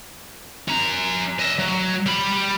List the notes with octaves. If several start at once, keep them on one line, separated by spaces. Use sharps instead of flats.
C#4 A#5
D#5 E5
F#3
G3 B5